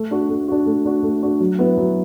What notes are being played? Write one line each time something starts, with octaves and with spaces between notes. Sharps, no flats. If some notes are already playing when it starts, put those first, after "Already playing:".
Already playing: A3
D4 F#4
A3
D4 F#4
A3
D4 F#4
A3
D4 F#4
F#3
B3 E4 B4
F#3